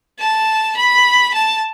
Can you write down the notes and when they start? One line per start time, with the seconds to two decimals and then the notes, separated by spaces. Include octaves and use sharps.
0.19 A5
0.77 B5
1.34 A5